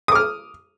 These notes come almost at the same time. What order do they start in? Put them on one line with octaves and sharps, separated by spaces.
D#6 D6 F6